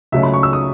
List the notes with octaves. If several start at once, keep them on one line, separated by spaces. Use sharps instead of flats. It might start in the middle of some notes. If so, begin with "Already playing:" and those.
C#2 C#3 F#3 A3 C#4 E5
B5
C#6
E6
D#6